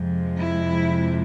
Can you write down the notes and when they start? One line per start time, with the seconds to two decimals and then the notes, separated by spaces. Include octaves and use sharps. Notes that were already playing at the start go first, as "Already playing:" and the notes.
Already playing: F2 C3 F3 G#3
0.38 E4